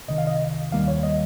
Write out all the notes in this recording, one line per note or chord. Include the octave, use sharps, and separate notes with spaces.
C2 C3 D#3 D#5
F5
D#5
D#2 D#3 G3 A#3 F5
C#5
D#5